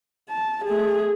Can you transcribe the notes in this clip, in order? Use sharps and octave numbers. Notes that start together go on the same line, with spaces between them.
A5
A3 G#4